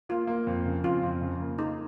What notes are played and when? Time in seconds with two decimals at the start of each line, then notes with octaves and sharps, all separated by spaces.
0.09 A#3 F4
0.27 A#3
0.47 F2
0.66 C#3
0.84 F2 F4
1.03 F2
1.21 C#3
1.40 A#3
1.59 D#4 G#4